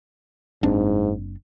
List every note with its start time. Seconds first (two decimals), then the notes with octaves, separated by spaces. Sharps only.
0.63 F#1 G#2 C4 D4